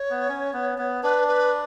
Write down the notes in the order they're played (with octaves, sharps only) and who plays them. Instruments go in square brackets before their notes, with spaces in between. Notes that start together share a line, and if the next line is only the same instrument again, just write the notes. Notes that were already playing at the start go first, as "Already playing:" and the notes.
Already playing: [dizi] C#5
[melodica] B3
C#4
B3
B3
[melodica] D4 [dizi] B4
[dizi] B4